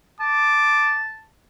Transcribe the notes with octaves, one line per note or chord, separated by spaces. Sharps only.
A5 D6